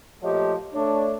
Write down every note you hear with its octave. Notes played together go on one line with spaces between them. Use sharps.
A#2 F3 A3 G4 C#5 D#5
A3 D4 C#5